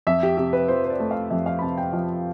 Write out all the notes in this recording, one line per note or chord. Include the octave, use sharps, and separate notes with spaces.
F2 E5
G4
C3 G4
B4
F3 C5
C5
D5
A3
F5
F2 E5
F5
B5
C3 A5
G5
F3 F5